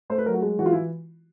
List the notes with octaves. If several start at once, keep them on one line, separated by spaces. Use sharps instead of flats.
A3 C5
B4
F#3 A#4
F#4
G#3
E3 F#4
F4
E4
E3